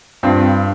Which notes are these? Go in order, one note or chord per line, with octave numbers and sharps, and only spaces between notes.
G2 C4 F4